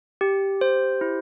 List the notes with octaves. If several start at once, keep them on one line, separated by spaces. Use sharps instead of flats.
G4
C5
E4